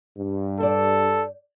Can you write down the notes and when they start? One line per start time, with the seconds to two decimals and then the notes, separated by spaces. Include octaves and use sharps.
0.18 G2
0.60 A4 C5 D5